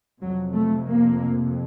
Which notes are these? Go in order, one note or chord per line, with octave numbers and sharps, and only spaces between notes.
F2 C3 F#3
A3
A#3